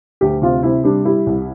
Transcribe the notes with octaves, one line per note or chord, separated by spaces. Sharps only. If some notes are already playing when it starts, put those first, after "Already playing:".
D2 G4
C3 F4
C3 E4
G3 D4
G3 E4
C2